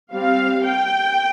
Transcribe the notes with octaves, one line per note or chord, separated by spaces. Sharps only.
G3 C4 F5
G5